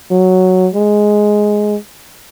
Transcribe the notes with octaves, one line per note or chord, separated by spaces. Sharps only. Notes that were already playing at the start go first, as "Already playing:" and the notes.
F#3
G#3